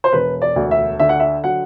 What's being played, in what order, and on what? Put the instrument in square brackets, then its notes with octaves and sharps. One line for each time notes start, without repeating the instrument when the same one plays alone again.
[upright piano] C5
E1 B4
D5
D2
E5
D3 E5
F#5
E5
F#3 F#5